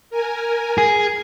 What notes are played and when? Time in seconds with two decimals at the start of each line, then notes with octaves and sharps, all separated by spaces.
0.10 A#4 G#5
0.78 G#4